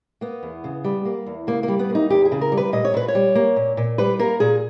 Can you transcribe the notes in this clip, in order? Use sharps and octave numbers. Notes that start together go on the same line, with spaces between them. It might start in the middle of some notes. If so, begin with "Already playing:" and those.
A#3 B3
E2
C#3
G3
A#3
E2
C#3 A#3
A#3
G3
B3
A#3
D#4
E2 G4
G#4
C#3
A#4
G3
B4
A#2 D#5
C#5
A#2 B4
C#5
G3
A#3
A#2
A#2
G3 B4
A#3 A#4
A#2 G#4